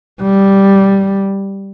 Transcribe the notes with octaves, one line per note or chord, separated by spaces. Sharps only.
G3